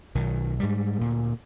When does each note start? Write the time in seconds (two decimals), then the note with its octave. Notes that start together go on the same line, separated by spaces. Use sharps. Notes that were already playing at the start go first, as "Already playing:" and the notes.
0.15 B1 D#3
0.60 G#2 G3
1.00 D2 A#2